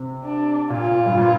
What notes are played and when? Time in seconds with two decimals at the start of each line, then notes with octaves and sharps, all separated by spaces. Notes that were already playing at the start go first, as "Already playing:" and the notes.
Already playing: C3
0.24 D4
0.70 A#2 F4
0.95 A#2
1.06 G2
1.17 A#2